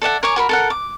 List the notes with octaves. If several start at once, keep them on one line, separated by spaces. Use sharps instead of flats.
A4 D5 E5 F#5
A#4 C#5 G#5 D6
F#4 A#4 B5
A4 A#4 F#5
D6